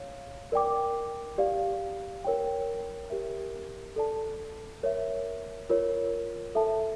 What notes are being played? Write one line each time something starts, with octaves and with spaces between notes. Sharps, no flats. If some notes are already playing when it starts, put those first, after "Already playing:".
Already playing: C#5 F5
A#4 D5 G5 D6
G4 D5 F5
A#4 C#5 G5
G4 A#4 E5
A4 D5 A5
A#4 C#5 E5
F4 A#4 C#5
A4 E5 A5